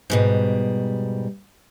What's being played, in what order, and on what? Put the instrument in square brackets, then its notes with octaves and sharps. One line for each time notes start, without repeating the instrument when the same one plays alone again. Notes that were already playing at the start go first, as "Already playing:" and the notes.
[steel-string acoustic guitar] G#2 B2 G3